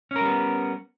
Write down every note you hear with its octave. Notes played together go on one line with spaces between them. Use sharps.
G3 B3 C#4 A#4